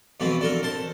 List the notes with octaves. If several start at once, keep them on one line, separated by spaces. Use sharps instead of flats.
F2 B2 E3 F3 B3 C4
D4 A4 A#4
C5 A5 C6